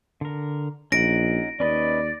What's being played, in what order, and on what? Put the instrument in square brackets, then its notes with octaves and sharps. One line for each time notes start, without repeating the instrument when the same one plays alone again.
[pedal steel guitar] D3 A#4
[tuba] A#1 [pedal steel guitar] C#4 D#4 F#5 [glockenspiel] A#6 D7
[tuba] D#2 [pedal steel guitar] C#4 B4 D#5 [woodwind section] D5